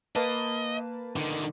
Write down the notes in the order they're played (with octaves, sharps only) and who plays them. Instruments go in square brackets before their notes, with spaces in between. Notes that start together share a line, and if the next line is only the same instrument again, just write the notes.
[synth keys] A#3 B4 A5 [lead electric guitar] D#5
[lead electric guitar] D3 D#3